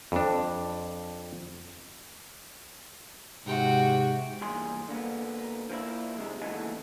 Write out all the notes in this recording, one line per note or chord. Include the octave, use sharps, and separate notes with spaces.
F2 D4
G#2 C3 F#4 G5
E2 G2 A#2 G#4 C6
D3 A#3 B3
F3 A#3 E4
G#2 C3 G#3
D#2 C#3 E3 G#3 A3 B3